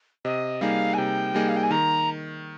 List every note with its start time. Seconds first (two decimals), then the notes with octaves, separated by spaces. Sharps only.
0.25 C3 D#5
0.61 G3 A#3 D#4 G#4 F5
0.94 G#5
0.98 C3 G5
1.34 G3 A#3 D#4 G#4
1.49 F5
1.56 G5
1.63 G#5
1.71 D#3 A#5